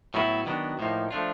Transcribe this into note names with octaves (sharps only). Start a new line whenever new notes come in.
A2 F#3 B3 E4
D#3 F#3 B3 D4
A2 F3 A#3 D#4
F3 A3 D4 F4